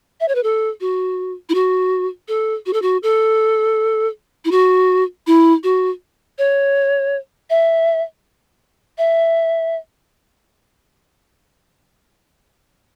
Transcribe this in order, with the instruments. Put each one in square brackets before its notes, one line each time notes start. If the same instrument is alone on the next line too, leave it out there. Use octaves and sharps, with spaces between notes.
[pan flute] E5
C#5
B4
A4
F#4
E4
F#4
A4
F#4
A4
F#4
A4
E4
F#4
E4
F#4
C#5
E5
E5